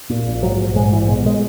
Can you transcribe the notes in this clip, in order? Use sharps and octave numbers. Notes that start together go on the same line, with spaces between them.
A#2
A#1
G#2 F#3
A#1
G#2 G#3
A#1 E3
B2 G#3
G#3